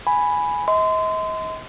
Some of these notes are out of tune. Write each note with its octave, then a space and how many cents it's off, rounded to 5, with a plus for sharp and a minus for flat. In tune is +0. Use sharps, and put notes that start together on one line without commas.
G#5 +0 B5 +0
D#5 +40 C6 -30